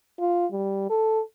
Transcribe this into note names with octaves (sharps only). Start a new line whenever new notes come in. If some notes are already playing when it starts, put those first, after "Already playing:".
F4
G3
A4